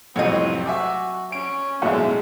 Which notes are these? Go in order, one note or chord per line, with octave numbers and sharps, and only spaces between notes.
C2 F2 A2 F#3 C4 D#5
F#4 E5 G#5 D6
C#4 D7
B1 F#2 A2 G#3 E5 F#5